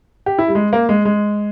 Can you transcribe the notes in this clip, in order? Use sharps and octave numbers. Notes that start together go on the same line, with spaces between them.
G4
E4
G3
G#3
A#3
G#3
G#3